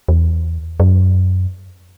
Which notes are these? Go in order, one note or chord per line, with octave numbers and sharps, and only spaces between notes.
E2
F#2